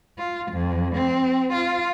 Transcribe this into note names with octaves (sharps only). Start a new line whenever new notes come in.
F4
F2
C4
F4